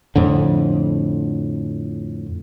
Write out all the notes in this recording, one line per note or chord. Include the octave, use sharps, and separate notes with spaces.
F2 A2 D3